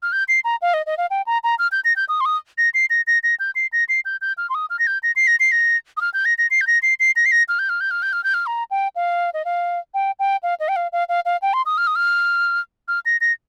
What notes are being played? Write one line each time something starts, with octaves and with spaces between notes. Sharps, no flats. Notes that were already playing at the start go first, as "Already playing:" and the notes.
F6
G6
C7
A#5
F5
D#5
D#5
F5
G5
A#5
A#5
F6
G6
A#6
G6
D#6
C6
D#6
A#6
C7
A#6
A#6
A#6
G6
C7
A#6
C7
G6
G6
F6
C6
D#6
F6
A#6
G6
A#6
C7
A#6
C7
A#6
D#6
F6
G6
A#6
A#6
C7
G6
A#6
C7
C7
A#6
C7
A#6
F6
G6
F6
G6
F6
G6
F6
G6
F6
A#5
G5
F5
D#5
F5
G5
G5
F5
D#5
G5
F5
F5
F5
F5
G5
C6
D#6
F6
D#6
F6
F6
A#6
A#6